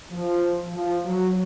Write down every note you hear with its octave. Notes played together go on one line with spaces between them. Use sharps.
F3
F3
F#3